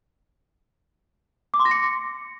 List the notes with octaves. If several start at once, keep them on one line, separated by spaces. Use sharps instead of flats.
D6
C6
A#6
C#7